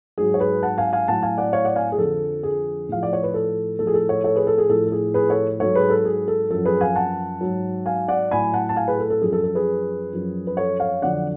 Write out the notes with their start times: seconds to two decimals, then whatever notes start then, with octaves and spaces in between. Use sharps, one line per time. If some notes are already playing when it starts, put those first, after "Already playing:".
0.18 G#2 F#3 G#4
0.34 C#5
0.40 G#4 B4
0.63 F#5 A5
0.78 F5 G#5
0.93 F5 G#5
1.08 A2 F#3 F#5 A5
1.23 F5 G#5
1.38 D5 F#5
1.53 C#5 F5
1.64 D5 F#5
1.76 F5 G#5
1.92 G#4
1.98 F2 D3 F3 A4
2.43 G#4
2.89 A2 F3 F5
3.03 D5
3.13 C#5
3.23 B4
3.34 A4
3.79 A2 F3 A4
3.87 G#4
3.94 A4
4.09 A4 C#5
4.24 A4 C#5
4.36 G#4 B4
4.47 A4
4.58 G#4
4.69 A2 F3 A4
4.87 A4
4.92 G#4
5.14 G#4 B4
5.30 A4 C#5
5.60 G#2 F#3 A4 C#5
5.75 G#4 B4
5.90 A4
6.05 G#4
6.28 A4
6.50 F#2 F3 A4
6.65 G#4 B4
6.81 F5 G#5
6.96 F#5 A5
7.41 G#2 F#3
7.86 F5 G#5
8.08 D5 F#5
8.31 A2 F#3 G#5 B5
8.54 F#5 A5
8.69 A5
8.76 F5 G#5
8.87 G#4 B4
8.99 A4
9.10 A4
9.21 F#2 F3 G#4
9.33 A4
9.44 A4
9.55 G#4 B4
10.12 F#2 F3
10.47 B4
10.57 A4 C#5
10.80 C#5 F5
11.02 F2 D3 F#3 D5 F#5